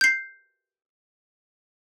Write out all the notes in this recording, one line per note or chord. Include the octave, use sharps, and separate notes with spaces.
G6 C7